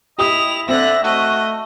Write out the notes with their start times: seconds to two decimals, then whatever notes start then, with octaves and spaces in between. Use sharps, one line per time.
0.18 E4 G4 D#5 D#6 F7
0.69 D3 C4 E5 F#6 A#6
1.04 A3 F#4 D#5